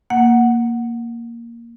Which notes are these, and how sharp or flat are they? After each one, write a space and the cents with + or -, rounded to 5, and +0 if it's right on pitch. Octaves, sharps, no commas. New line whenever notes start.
A#3 +0 F#5 +0